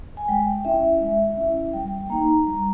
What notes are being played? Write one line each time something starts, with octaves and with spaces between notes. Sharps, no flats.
G#5
G#3 G5
C#4 E4 E5
G#3
C#4 E4
G3 G5
A#3 D#4 A#5
G3